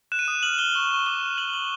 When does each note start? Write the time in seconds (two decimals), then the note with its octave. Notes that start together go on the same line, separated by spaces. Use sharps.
0.12 F#6 E7
0.19 D#7
0.25 D#6 E7
0.43 F6 F#7
0.59 F6 G7
0.74 C#6 F#7
0.91 C#6
1.06 D6 G7
1.23 F6
1.38 F#6 F#7
1.53 F#6 F#7